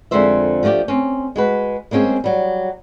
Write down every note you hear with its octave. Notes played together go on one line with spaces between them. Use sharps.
F2 D3 G#3 A#4 C5 E5
F3 A3 D4 F#4 G4
C4 C#4
G#3 F#4 B4
G#3 A#3 C4 C#4 G#4
F#3 G3